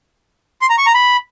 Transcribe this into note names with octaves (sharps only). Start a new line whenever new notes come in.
C6
A#5
C#6
A#5
B5